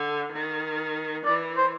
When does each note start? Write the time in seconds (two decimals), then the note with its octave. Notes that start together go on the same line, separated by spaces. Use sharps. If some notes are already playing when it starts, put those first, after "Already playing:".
Already playing: D3
0.32 D#3
1.25 E3 D5
1.57 C5